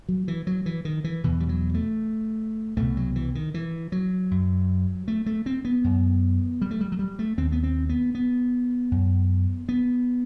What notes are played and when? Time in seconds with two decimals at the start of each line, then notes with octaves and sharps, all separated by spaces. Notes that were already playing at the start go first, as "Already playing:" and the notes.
0.08 F#3
0.28 E3
0.47 F#3
0.66 E3
0.85 D#3
1.04 E3
1.24 E2 B2 E3
1.40 G3
1.49 F#3
1.74 A3
2.77 C2 B2 A3
2.97 F#3
3.16 E3
3.35 D#3
3.54 E3
3.92 F#3
4.31 F#2
5.08 A3
5.26 A3
5.46 C4
5.65 B3
5.84 F#2
6.61 G3
6.71 A3
6.81 G3
6.92 F#3
6.99 G3
7.19 A3
7.37 D#2 C4
7.52 B3
7.63 C4
7.89 B3
8.15 B3
8.91 F#2
9.69 B3